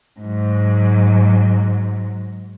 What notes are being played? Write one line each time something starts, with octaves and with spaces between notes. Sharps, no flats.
G#2 F#3